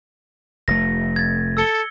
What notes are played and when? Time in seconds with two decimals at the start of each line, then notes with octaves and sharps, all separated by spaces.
0.68 F1 A3 A#6
1.16 G#6 A6
1.57 A4 E6 C#7 G7